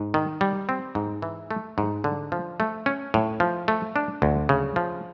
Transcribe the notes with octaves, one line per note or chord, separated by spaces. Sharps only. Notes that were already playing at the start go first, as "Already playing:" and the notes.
Already playing: G#2
D#3
G3
C4
G#2
E3
A3
G#2
D3
F3
A3
C#4
A2
F3
A3
D4
D2
C#3
F3